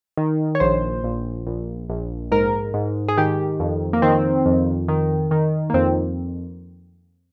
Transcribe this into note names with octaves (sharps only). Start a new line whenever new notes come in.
D#3
C#5
A#1 C5
A#1
A#1
A#1
G#2 A#4
G#2
G#4
D#3 G4
F2
A#3
D#3 C4
F2
D#3
D#3
A#3
F2 C4